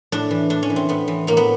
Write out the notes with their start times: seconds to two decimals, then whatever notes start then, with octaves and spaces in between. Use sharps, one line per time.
0.12 A2 D4
0.31 E3
0.50 A2 D4
0.63 C#4
0.70 E3
0.76 C4
0.89 A2 B3
1.08 E3
1.27 A2 A#3
1.37 B3